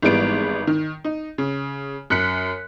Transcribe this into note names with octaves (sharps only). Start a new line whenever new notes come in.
G#1 E3 G3 G#3 B3 D7
D#3
D#4
C#3
F#2 F#6 B6 C#7